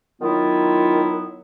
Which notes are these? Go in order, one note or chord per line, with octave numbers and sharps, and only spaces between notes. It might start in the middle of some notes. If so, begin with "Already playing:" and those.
D#3 F#3 B3 E4 F4